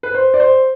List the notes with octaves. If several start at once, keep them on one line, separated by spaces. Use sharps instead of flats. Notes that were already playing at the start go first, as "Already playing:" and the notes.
B4
C5
D5
C5